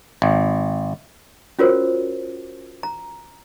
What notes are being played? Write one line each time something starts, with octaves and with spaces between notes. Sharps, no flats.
G#1
C#4 F4 F#4 A#4 C5 C#5
A#5